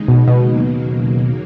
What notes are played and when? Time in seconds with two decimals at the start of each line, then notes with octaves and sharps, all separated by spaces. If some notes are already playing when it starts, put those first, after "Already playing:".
Already playing: D#2 C#3 G#3 D#4
0.08 B2
0.28 B2
0.47 D#2 C#3 F#3 A#3